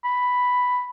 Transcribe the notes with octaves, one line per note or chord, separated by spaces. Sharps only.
B5